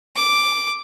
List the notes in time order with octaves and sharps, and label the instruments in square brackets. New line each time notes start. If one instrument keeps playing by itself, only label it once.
[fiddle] D6